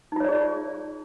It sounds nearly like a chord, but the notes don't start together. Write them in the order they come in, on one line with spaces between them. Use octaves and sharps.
D#4 F4 C#5 D5 G#4